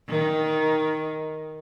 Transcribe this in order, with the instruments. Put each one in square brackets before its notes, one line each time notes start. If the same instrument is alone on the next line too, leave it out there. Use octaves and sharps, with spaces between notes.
[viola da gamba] D#3